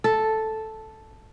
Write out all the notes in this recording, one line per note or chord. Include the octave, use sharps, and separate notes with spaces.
A4